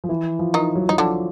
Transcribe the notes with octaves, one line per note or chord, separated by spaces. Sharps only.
F3
E3
F3
D#3 D#4
F#3
F3
F#3 D#4
D3 F3 D4